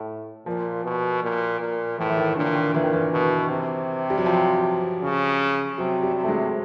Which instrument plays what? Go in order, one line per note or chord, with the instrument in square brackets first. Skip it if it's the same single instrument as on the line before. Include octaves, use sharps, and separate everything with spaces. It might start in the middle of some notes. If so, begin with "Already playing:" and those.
Already playing: [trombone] A2
[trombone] A#2 [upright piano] F3
[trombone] B2
A#2
A#2
[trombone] A2 [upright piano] E3
[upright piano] E3
D#3
[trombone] A#2 [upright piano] D3
[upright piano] D#3
[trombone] A#2 [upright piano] E3
[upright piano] D#3
E3
[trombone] B2
C3
[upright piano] G3
F#3
F3
[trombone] C#3
[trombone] C3 [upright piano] F#3
[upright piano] G3
[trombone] C3
[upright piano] A3
G#3